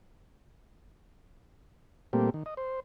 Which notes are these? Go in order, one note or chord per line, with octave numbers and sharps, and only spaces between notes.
A#2 G3 A3 A#3 C4 G4
D#3
D#5
C5